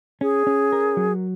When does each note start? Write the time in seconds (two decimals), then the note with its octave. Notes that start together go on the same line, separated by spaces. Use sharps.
0.21 C#4 G#4
0.47 C#4
0.73 A#4
0.97 F#3